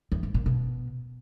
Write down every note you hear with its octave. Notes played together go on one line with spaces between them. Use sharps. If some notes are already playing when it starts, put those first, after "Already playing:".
E2
G2
A#2
B2